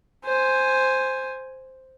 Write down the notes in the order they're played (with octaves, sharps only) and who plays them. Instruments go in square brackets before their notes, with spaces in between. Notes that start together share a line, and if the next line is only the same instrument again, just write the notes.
[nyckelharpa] C5 G#5